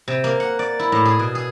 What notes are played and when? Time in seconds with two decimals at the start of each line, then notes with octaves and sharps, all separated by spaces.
0.08 C3
0.24 A#3
0.40 F#5
0.59 D5
0.79 E4
0.92 A2
1.05 G#4
1.19 B2
1.35 G#4